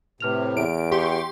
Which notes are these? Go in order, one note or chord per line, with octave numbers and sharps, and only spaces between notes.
A2 C3 B4 F6 F7
E2 D7
G4 G5 C6 C#6